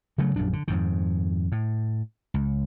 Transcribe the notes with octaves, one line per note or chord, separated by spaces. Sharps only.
C#3 F#3 A3
A#1 F#2 D4
D3
F2 G#2 D#3
A2
C#2